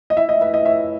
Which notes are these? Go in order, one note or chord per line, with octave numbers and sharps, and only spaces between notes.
D#5
E4 E5
D#5
B4 E5
D#5
C#5 E5